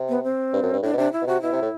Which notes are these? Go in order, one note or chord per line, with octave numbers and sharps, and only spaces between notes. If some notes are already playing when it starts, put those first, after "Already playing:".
Already playing: C3
B3
C4
G2
F#2
G2
A2 D4
B2
C3 D4
E4
B2
C3 F#4
B2 E4
C3
A2